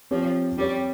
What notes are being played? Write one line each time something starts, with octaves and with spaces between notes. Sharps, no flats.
F3 C4 G4 C#5
G3 C4 G4 C#5